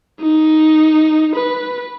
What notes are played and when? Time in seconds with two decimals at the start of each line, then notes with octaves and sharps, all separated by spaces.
0.21 D#4
1.36 B4